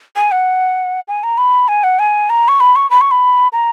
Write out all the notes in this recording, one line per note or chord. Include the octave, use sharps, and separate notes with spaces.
G#5
F#5
G#5
A#5
B5
G#5
F#5
G#5
A#5
C#6
B5
C#6
B5
C#6
B5
A#5